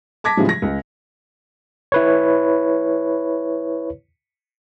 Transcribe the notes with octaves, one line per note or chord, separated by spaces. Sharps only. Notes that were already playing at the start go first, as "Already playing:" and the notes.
A5 D6 G#6 A#6 B6
A2 C#3 E3 F3 G3 G#3
A#6
C#2
E4 B4 C#5